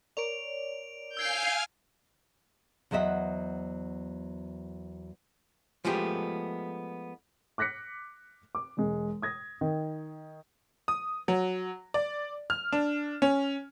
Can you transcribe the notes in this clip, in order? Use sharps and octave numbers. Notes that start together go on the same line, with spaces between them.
A#4 C#5 D5 D7 F7
F5 G#5 E6 F6 G6 G#6 C7 D7
E2 F#3 C5 D#5 E5 F#5
F3 G#3 A3 B3 G4
D6 F#6 A#6 B6 C#7
D6
E1 G#3
D#6 G#6 A#6
D#3
D#6
F#3
D5
F6
D4
C#4